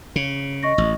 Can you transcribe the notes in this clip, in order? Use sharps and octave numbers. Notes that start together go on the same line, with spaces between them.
C#3
D#5 C#6 A#6
A1